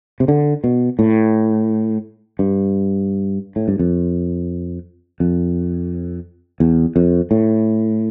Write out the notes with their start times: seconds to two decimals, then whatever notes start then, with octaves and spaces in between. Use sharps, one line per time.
0.20 C3
0.28 D3
0.64 B2
0.99 A2
2.39 G2
3.56 A2
3.68 G2
3.79 F2
5.20 F2
6.60 E2
6.96 F2
7.31 A2